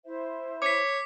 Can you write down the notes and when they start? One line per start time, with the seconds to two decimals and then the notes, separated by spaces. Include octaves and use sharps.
0.05 E4 C5 E5
0.62 C#5 D6 B6